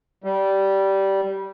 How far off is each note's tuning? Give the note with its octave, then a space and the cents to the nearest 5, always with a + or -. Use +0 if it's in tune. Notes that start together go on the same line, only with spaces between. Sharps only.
G3 -15